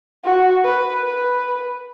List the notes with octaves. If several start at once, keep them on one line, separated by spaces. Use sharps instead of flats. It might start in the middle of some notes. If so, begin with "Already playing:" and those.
F#4
B4
B4